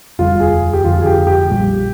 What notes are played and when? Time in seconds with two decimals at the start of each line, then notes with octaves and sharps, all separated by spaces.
0.19 F1 D#2 D3 G3 F4
0.40 G#4
0.73 G4
0.84 G1 F2 D3 F4
1.01 G#4
1.06 G4
1.27 G4
1.49 A#1 A#2 G3